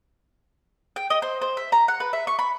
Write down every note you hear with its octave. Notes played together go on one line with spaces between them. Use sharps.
G5
D#5
C5
C5
E5
A#5
F#5
B4
E5
C#6
B5